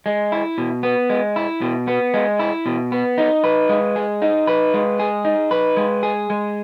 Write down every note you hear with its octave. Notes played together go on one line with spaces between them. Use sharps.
G#3
E4
B2
B3
G#3
E4
B2
B3
G#3
E4
B2
B3
D#4
B4
G#3
G#4
D#4
B4
G#3
G#4
D#4
B4
G#3
G#4
G#3